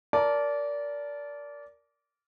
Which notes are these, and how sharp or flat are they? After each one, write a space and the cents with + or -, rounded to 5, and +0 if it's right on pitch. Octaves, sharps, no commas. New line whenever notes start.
A#4 +0 D5 -20 A5 -15